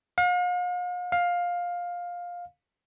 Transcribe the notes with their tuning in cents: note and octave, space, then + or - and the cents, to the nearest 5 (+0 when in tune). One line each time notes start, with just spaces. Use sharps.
F5 +45
F5 +15